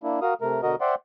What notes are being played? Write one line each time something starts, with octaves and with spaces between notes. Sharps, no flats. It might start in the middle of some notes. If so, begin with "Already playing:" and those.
A#3 D4 E4
F#4 A#4 F5 D#6
C3 A3 A#4
B2 D3 F#4 A#4 D#5
C5 D5 E5 F#5 G5 C6